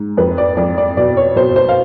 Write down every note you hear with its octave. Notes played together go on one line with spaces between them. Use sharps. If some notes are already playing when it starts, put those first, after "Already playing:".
Already playing: G#2
F2 B4
D5
F2 D5
D5
B2 D5
C#5
B2 C5
C5
F5